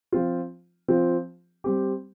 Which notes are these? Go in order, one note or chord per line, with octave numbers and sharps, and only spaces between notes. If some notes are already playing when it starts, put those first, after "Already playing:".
F3 C4 F4
F3 C4 F4
G3 C4 G4